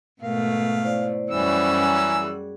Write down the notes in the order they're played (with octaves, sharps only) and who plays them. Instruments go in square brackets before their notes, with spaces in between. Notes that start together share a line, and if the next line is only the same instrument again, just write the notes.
[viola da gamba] G#2 B2 A3 [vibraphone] A#4 [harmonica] F5
[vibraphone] E4 C5 D5
[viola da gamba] F#2 G3 F#4 [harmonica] E3 C#4 E6
[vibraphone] G#5 A#5
G#4